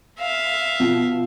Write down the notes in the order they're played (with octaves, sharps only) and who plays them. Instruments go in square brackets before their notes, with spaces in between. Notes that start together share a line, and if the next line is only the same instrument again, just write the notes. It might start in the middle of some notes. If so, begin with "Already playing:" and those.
[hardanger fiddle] E5 F5
[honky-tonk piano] B2 F3